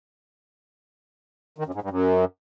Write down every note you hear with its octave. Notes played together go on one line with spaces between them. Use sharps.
D#3
F#2
G#2
G2
F#2